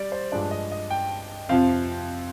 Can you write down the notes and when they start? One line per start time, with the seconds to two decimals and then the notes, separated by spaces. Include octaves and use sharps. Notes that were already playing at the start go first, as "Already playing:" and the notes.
Already playing: G3 D5
0.12 C5
0.32 G2 F3 G#3 D4 D5
0.51 D#5
0.71 D#5
0.90 G5
1.49 F2 C3 F3 C4 F5